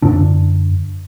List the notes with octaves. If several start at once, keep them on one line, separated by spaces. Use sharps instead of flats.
F#2 D3 D4